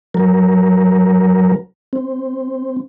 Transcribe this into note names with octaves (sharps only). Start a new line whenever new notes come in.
F#3 A#4
C4